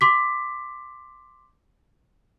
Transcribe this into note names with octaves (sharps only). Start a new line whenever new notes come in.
C6 D6 B6